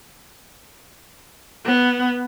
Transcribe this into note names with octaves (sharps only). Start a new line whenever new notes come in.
B3